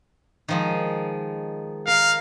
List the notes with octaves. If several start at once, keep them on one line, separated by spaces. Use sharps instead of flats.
D#3 F3 G#3
A#4 F5